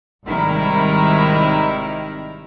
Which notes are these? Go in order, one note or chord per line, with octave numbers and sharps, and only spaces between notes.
G#1 C3 D#3 G3 E4 A#5